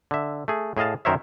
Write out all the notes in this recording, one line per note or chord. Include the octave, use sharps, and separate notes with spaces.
D3 E5
A3 G#4
A2 G#4 D#5 F5 A5
F#2 D#3 A#4 C5 C#5 E5